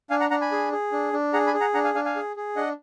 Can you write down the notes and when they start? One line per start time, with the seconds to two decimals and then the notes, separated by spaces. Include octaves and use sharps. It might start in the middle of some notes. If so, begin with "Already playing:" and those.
0.10 D4 F5 G#5
0.20 F#5 A#5
0.31 D4 F#5 A#5
0.41 G#5 B5
0.52 G#4
0.72 G#4
0.92 D4
1.13 D4
1.33 G#4 F#5 A#5
1.47 G#5 B5
1.54 G#4
1.61 F#5 A#5
1.74 D4 F#5 A#5
1.84 F5 G#5
1.95 D4 F5 G#5
2.05 F5 G#5
2.16 G#4
2.36 G#4
2.56 D4 D#5 F#5